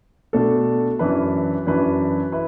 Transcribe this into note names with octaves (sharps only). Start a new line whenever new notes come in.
B2 A3 D4 A4
F#2 E3 D4 B4
F#2 E3 D4 B4
E4 B4